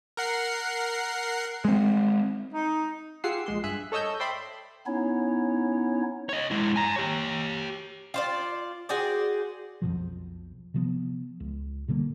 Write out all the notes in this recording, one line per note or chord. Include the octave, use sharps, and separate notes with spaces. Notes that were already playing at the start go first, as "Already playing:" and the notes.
A#4 F#5 C7
G#3 C4
D#4
F4 G4 G#4 F#5 E6 C7
A#1 G#3 C6
G2 G#4 E5 F#6
A4 C#5 D#5 E6 G6
C5 D5 E5 G5 B5 C6
B3 C#4 D#4 E4 C#5
C#5 D#5
G#3 E4
G#5 A#5
G4 C#5
F4 C5 D5
F#4 G#4 C5 D5
B1 F2 B2 F3
C3 F3 B3
C#2
B2 D3 G3 A#3